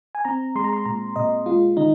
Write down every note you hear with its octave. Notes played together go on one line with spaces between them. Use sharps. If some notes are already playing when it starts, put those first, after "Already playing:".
G#5
C4 A#5
G#3 C6
A#5
C6
A#2 A#5
A#2 D#5
G#3 F4
D#3 D#4